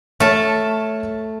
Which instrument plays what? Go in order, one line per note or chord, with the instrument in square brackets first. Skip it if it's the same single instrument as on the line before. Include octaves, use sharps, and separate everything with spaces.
[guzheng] A3 A5 [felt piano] A4 C#5 F6